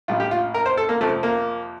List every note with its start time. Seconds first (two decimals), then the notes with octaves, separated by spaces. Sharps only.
0.08 A#1 A2 G3 F4
0.20 G4
0.31 F4
0.54 A#4
0.66 C5
0.77 A4
0.89 A#3
1.01 F2 C3 F3 A3
1.23 A#3